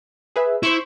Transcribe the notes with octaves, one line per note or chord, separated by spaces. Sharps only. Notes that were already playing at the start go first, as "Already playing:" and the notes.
G#4 B4 E5
E4 C5 C6 C#6